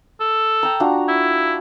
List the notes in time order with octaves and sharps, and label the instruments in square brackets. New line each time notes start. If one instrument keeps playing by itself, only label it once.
[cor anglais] A4
[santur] G5 A#5
D4 F4 F#4
[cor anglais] E4